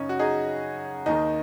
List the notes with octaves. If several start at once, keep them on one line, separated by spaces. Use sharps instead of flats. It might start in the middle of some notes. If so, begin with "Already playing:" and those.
Already playing: F#2 C#3 C#4 D#4
F#4
D#4 G#4
D#2 D#3 D#4